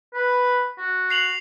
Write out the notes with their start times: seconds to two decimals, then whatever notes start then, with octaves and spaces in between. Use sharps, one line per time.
0.14 B4
0.78 F#4
1.10 C7 F7 F#7